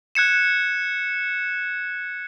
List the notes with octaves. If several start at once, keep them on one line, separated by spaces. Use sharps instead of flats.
F#6 G#6 C#7 E7